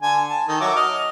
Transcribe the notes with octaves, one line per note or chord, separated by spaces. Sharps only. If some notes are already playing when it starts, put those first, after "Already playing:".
D3 G#5
A5
D#3 A4
F#3 E5 D6
D#5 F6